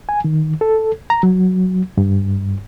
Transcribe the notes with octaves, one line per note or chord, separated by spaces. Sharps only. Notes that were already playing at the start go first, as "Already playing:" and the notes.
G#5
D#3
A4
A#5
F#3
G2